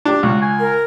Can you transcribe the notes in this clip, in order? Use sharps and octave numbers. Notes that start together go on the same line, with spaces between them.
D4 G4
C#2 F#4
G#5
A#4